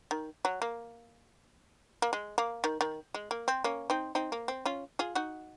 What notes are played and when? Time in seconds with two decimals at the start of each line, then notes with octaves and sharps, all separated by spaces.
0.11 D#3
0.45 F#3
0.62 A#3
2.02 A#3
2.13 G#3
2.38 A#3
2.64 D#3
2.81 D#3
3.14 G#3
3.31 A#3
3.48 C4
3.64 A#3 C#4
3.90 C4 D#4
4.15 C4 D#4
4.32 A#3
4.48 C4
4.66 C#4 F4
4.99 F4 G#4
5.15 D#4 F#4